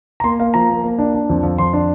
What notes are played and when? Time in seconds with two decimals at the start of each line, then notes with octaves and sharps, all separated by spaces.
0.20 A#5
0.24 A#3 C6
0.39 A#3 F5
0.54 F3 A#5
0.70 A#3
0.84 A#3
0.99 D4
1.14 D4
1.30 F2
1.43 F2
1.58 F2 C6
1.73 D4